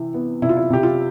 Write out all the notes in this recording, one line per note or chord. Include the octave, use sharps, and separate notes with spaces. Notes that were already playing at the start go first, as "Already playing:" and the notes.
Already playing: C3 E3
B3
C3 E4
F4
E4
C3 G4
F4